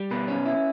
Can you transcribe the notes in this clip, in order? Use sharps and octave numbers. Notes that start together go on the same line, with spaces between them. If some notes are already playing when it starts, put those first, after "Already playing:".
Already playing: G3
B2 B4
C#4
E4